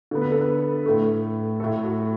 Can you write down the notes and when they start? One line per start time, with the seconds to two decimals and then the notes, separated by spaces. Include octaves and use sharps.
0.11 D3 B3
0.22 B4
0.32 A4
0.41 B4
0.86 A2 A3
1.60 A2 A3 A4
1.84 F#4